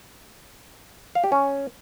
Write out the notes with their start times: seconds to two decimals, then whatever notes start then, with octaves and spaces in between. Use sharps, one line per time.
1.15 F5
1.24 G4
1.32 C#4